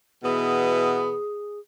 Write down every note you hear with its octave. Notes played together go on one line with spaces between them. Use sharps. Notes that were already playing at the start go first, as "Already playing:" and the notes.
B2 E3 B3 G#4